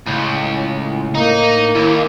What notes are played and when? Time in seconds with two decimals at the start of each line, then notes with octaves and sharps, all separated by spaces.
0.06 C#2 A2
1.15 A#3 D#4
1.75 D#2 E4